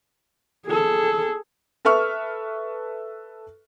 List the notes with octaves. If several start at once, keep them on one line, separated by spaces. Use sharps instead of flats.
G#4 A4
A4 B4 E5 C#6 F6